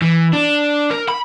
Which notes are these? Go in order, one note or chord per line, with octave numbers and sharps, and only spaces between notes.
E3
D4
A#4
B5